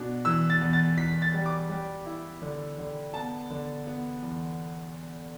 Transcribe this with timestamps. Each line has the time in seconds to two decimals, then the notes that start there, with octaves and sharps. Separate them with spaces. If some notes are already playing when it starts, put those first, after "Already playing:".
Already playing: B2 D4
0.25 E3 E6
0.50 A6
0.61 E2
0.73 A6
0.97 E2 B6
1.22 A6
1.34 G3
1.46 D6
1.69 G3
2.06 E4
2.42 D3
2.78 D3
3.14 B3 A5
3.50 D3
3.87 B3
4.22 E2